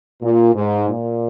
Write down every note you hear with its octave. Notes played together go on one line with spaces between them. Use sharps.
A#2
G#2
A#2